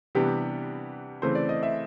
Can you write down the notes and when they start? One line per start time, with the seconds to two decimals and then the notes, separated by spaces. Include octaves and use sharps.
0.15 C3 E3 G3 B3 D4 G4
1.22 C#3 E3 A3 C4 C5
1.35 D5
1.49 D#5
1.63 E5